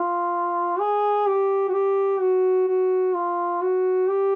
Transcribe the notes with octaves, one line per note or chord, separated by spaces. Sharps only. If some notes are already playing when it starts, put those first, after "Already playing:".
Already playing: F4
G#4
G4
F#4
G4
F#4
F#4
F4
F#4
G4